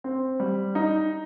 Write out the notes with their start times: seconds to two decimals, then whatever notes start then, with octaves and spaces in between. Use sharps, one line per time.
0.04 C4
0.40 G3
0.75 D#4